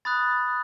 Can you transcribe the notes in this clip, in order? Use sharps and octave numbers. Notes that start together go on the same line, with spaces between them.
B5 D#6 F#6 A6